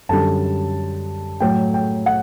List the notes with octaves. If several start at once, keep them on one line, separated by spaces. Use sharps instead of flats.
F#2 D3 G3 A5
A2 F#3 G5
G5
F#5